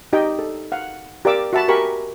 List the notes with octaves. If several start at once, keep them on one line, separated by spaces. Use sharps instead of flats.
D#4 G4 D#5 G5
A4
F5 F#5
G4 A#4 D5 F5 D6 E6
F#4 E5 A5 B5
G4 A#4 G#5 B5 C#6